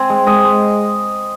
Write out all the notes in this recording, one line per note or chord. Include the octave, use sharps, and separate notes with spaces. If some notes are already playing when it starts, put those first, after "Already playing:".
Already playing: C4 G#5
G#3
G#3 D#5
G#3